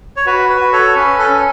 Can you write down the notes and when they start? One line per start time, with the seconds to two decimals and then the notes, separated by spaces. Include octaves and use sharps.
0.16 C#5
0.26 F#4 B4
0.49 B4
0.61 F#4
0.73 A4 C#5
0.96 C#4 B4
1.19 A4
1.30 C#4